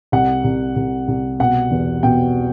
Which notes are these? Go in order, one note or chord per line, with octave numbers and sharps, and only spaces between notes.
C2 F#5
C2
C2
C2
B2 F#5
E2
B2 G5